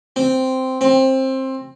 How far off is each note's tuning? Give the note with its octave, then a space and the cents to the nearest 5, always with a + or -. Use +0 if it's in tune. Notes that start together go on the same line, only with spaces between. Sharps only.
C4 -5
C4 +20